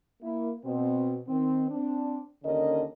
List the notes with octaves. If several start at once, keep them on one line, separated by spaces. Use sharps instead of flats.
A#3 E4
B2 C4
D#3 C4
C4 D4
D#2 D3 C#4 A#4 D#5